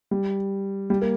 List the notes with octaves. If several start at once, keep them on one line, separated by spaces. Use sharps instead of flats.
G3
G3
A#3